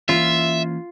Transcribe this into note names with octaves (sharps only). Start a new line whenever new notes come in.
E3 A#3 C#4 F4 E5